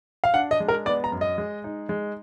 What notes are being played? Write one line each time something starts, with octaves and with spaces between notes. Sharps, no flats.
F5
D4 F#5
D#5
G#3
A#4
B3 D5
A#5
F#2
D#5
G#3
D#4
G#3